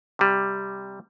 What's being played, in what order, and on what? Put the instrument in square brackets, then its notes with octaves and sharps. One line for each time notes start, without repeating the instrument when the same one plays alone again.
[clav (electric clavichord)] C3 G3